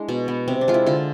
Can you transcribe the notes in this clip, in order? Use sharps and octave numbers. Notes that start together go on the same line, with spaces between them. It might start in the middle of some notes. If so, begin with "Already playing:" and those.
Already playing: G#3 D4 E4
B2
B3
C3 C4
D4
G#3 F4
E4
D3 F4